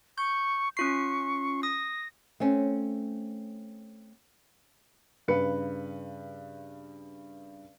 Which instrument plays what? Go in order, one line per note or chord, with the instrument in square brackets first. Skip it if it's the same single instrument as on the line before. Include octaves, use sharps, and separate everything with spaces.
[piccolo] C#6 [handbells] G6
[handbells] C#4 F4 C7 [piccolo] C#6
[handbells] D#6 [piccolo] A#6
[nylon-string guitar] A3 C4 C#4
[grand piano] G2 C#3 B4 C#7